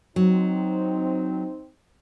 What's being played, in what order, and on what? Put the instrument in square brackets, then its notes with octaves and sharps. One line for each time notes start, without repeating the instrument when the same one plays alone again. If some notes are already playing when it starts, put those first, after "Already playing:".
[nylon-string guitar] F#3 [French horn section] C4 D#4